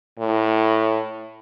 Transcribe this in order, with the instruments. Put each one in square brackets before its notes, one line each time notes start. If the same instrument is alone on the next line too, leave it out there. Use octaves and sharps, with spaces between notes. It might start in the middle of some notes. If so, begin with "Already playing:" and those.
[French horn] A2